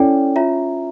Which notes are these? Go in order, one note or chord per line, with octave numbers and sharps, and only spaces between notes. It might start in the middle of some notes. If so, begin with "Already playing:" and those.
Already playing: C#4 E4 A4 D5 G5
F4 C#5 E5 A#5